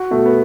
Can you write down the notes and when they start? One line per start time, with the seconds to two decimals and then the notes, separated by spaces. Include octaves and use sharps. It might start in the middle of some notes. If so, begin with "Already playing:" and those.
Already playing: F#4
0.11 B2 A3
0.26 B3